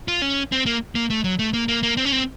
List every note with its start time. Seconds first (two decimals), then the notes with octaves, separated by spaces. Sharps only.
0.08 F4
0.22 C#4
0.52 C4
0.66 A#3
0.95 A#3
1.10 A3
1.24 F#3
1.39 A3
1.53 A#3
1.68 A#3
1.83 A#3
1.97 C4
2.05 C#4
2.12 C4